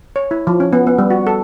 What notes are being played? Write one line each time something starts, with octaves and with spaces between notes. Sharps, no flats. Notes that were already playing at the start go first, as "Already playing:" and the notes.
C#5
E4
F3
C#4
B3
B3
G3
F#4
A4